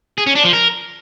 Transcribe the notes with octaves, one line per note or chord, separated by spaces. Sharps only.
G#4
C#4
D4
F3
A#4